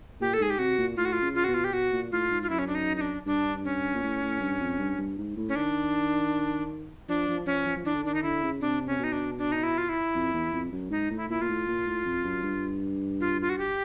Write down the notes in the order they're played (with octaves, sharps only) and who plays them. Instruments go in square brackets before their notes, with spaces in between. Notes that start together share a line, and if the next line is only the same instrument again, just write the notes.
[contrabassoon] A#2 [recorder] G4
[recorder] A4
[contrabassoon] G#2 [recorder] G#4
[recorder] G4
[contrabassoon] C3 [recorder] F#4
[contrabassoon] A#2
[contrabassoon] A2 [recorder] F4
[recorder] F#4
F4
[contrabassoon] C#3
[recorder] F4
[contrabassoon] B2 [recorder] F#4
[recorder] F4
G4
[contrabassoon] B2 [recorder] F#4
[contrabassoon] A#2
[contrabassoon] A2 [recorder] F4
[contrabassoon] G#2
[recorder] F4
[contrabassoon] F#2 [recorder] E4
[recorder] C#4
D4
D#4
D#4
D4
[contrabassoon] G2 [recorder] D4
[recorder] C#4
[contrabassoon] A#2
A2
A2
G2
F2
G2
G2
G#2
A2
[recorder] C#4
[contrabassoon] D#3 [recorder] D4
[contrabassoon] F3 [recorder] D4
[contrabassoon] F3
[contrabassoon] F3 [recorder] C#4
[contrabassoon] F3
F3
[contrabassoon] E3 [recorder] D4
[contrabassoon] D3
[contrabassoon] D#3 [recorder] D4
[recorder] D#4
[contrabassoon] D3 [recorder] E4
[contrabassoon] C#3
[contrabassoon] C3 [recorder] D4
[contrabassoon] C3 [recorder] C#4
[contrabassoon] B2 [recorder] D#4
[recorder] D4
D4
D#4
E4
F4
E4
[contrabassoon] F2
E2
F2
F#2
[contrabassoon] G#2 [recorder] D#4
[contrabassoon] A2
[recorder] E4
[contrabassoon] A#2 [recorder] E4
[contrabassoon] A#2 [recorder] F4
[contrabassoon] A2
A#2
A2
F2
F#2
G2
[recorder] F4
F4
F#4
G4